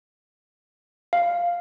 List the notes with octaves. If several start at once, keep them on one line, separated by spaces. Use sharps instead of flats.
F5